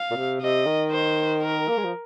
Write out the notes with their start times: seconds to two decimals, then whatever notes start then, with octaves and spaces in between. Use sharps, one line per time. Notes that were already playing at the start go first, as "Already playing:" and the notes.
Already playing: F5
0.11 A#2
0.16 C3
0.41 C3 D#5
0.66 D#3
0.91 C5
1.42 A#4
1.69 A#3
1.77 G#3
1.85 F3